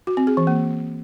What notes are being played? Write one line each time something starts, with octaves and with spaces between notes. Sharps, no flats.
F#4
C4
G#4
E3
A#3